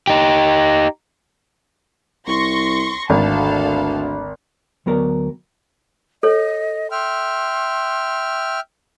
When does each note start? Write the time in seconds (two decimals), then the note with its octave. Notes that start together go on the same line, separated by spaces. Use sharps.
0.07 D#4 G4
2.28 C2 C6 C#6 A#6
3.10 G#1 D2 A4 F5 A5
4.86 D2 F#3 B3 A#4 D5
6.23 A4 C#5 D#5
6.91 E5 G5 C6 F6